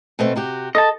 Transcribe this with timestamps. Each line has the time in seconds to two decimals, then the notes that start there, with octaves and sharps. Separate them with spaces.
0.19 B2 A3 C4
0.36 C3 F#4 G4
0.75 A4 D#5 A5